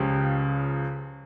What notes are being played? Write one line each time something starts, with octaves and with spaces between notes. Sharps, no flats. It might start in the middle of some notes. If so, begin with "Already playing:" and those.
Already playing: C#2 C#3 F3 G4